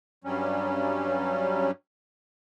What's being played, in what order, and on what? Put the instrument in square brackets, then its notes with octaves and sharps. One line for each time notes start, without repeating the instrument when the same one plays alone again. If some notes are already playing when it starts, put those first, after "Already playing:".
[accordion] G2 F#3 G3 C#4